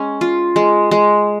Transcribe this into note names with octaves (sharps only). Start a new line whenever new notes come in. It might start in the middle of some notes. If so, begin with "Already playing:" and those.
Already playing: G#3 C#4
F4
G#3
G#3